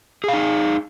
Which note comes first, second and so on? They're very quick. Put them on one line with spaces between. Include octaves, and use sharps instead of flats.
G#4 F5 D#4